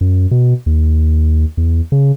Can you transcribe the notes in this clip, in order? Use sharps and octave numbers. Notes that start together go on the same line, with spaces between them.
F#2
B2
D#2
E2
C#3